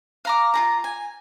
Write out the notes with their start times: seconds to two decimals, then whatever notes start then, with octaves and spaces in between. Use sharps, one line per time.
0.25 F5 A#5 D6
0.54 F4 G#4 A#5
0.84 G#5